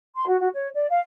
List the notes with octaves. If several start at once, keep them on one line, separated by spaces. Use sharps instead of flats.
C6
F#4
F#4
C#5
D5
F5